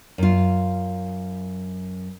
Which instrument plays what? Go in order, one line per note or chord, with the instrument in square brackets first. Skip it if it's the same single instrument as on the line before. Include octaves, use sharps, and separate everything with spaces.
[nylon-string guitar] F#2 F4